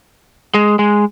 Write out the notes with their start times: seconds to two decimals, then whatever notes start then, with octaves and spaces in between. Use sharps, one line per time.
0.54 G#3
0.79 G#3